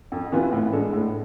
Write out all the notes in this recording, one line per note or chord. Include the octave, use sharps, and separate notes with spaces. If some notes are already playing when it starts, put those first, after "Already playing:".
F2
C3 E3 B3 F4
A2
G#3 D4 A4
A2